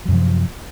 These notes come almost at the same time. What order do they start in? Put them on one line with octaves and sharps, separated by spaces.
F#3 F#2 C3 F3